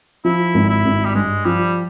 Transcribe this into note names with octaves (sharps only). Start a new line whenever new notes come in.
F3 E4
G#1
E4
G#1
G3
G2 G#3
F3 G3